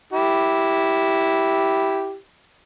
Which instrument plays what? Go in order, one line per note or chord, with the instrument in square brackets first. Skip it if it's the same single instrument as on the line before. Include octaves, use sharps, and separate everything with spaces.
[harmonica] E4 G4